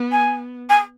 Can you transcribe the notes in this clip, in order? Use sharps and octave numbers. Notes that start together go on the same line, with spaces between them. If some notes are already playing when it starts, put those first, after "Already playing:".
Already playing: B3
G#5
G#5